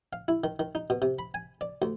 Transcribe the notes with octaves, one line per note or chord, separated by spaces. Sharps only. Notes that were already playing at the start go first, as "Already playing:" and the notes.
F5
E4
D#3
D#3
D#4
B2
C3
B5
G#5
D5
D2